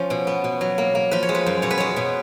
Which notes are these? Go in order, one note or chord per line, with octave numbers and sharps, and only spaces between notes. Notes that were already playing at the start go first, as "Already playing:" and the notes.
Already playing: F3 C#4
B2
B3
B2
F#3
A#3
A#3
F3 B4
C#5
G#3
B4
F#2
B2 C#5
B4
G#3 C#5
B2